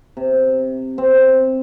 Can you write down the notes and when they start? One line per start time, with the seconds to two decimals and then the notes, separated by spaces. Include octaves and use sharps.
0.17 C3
0.98 C4